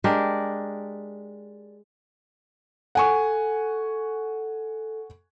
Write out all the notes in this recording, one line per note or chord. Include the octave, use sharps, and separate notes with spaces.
G#3 D4 G4 A#4
A4 F#5 G#5 C#6